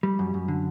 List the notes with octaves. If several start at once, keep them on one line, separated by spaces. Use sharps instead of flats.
G3
F#2
F#2
D3